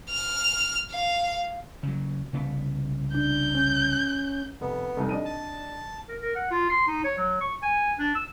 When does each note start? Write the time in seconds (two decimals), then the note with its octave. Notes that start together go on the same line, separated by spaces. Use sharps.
0.10 F6
0.91 F5
1.83 C#3 F#3
2.33 C2 C#3 B3
3.14 D4 G6
3.54 C#4
4.61 F1 B3
4.96 F1 C2 D#4
5.09 D4 D#5 D#7
5.25 A5
6.09 A#4
6.22 A#4
6.35 F#5
6.51 F4
6.70 C6
6.87 D#4
7.04 C#5
7.17 F#3
7.41 C#6
7.62 G#5
7.99 D4
8.15 E6